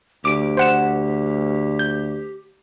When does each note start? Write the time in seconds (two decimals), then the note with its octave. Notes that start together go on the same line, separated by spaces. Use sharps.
0.25 D2 G4 D6 D7
0.57 C5 F#5 E7
1.79 G6